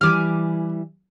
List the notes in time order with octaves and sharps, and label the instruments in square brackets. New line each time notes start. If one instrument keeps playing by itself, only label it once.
[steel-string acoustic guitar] E3 G3 [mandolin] G#5 D6 F6